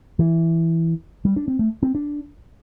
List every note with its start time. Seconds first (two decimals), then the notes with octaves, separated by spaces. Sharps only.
0.19 E3
1.25 G3
1.36 D4
1.48 C4
1.59 A3
1.83 C4
1.95 D4